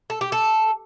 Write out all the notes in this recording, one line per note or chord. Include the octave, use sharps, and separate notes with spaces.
A4
G4
A4